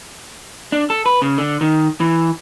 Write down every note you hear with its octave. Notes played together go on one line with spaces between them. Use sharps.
D4
A4
B4
C#3
D3
D#3
E3